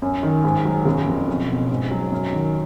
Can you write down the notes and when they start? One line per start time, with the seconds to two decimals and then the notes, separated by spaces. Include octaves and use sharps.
0.02 F#2
0.23 D#3
0.44 G#2
0.65 F#3
0.85 F#1
1.07 F2
1.28 B1
1.49 B2
1.70 G#2
1.91 F#3
2.12 F#2
2.33 D#3